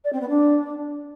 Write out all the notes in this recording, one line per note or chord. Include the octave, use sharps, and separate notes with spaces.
D5
C4
B3
D4